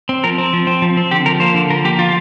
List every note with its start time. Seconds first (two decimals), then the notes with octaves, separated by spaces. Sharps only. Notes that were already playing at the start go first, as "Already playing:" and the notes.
0.09 C4
0.24 F3 A#4
0.38 C4
0.53 F3
0.67 C4
0.82 F3
0.97 C4
1.11 D3 G4
1.26 F3 A#4
1.40 A#3 C5
1.55 D3
1.70 F3 A#4
1.85 A#3 G4
1.99 F3 F4